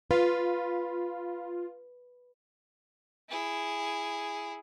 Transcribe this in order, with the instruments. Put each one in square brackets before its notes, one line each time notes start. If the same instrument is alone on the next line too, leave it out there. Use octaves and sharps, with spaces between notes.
[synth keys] F4 [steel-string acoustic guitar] B4
[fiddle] E4 G#4